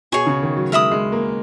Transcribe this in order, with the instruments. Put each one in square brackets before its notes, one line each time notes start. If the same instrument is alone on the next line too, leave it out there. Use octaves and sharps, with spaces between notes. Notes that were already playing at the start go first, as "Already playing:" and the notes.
[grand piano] B2 [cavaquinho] G#4 C#5 G#5 C#6
[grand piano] C#3
D#3
F#3
[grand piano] G#3 [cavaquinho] A#4 E5 B5 D#6
[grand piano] G#3
A#3